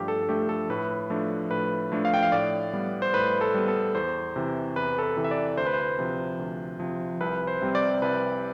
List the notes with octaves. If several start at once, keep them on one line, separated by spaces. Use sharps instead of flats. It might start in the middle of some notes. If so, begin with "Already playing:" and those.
Already playing: G2 F3 A3 D4 G4
A4
F3 A3 D4 G4
A4
A2 B4
F3 A3 D4
A2 B4
F3 A3 D4
F5
G5
F5
A2 D5
G3 B3
C5
A2 B4
A4
G3 B3
A4
E2 C5
C3 E3
E2 B4
A4
B4
C3 E3
E5
D5
D2 C5
B4
C5
C3 F3
D2
C3 F3
C2 B4
C5
C3 G3 C4
D5
C2 B4